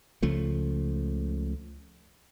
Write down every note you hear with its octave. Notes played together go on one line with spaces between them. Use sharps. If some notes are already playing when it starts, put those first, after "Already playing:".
C#2 C#3 F3 A3